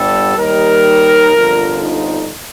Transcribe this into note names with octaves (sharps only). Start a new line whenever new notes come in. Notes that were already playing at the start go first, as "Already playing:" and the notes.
Already playing: G1 G2 D3 G3 A4
D#2 D#3 G3 A#4
G1 F2 D3 F3
D#4